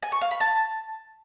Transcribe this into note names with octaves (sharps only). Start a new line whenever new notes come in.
G#5
C#6
F5
B5
A5